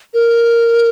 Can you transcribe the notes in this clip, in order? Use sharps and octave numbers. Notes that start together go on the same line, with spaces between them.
A#4